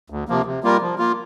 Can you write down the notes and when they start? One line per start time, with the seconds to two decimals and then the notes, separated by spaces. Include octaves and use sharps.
0.10 D2
0.28 C3 F3 A#3
0.46 C3
0.63 G3 A#3 F4 A#4
0.81 F3
0.98 A#3 F4